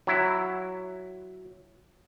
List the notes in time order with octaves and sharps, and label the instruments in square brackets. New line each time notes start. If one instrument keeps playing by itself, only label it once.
[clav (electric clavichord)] F#3 E4